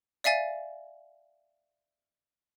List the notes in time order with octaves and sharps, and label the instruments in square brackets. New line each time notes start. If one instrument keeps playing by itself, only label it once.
[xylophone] D5 E5 F5 G#5 A6